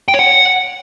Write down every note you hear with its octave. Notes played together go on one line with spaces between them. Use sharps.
G5
C#5
F#5